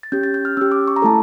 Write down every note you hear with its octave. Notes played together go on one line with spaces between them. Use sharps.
A6
C#4 G4 G6
A6
G6
F6
C#4 G4 E6
D6
C#6
A#5
A3 E4 A4 A5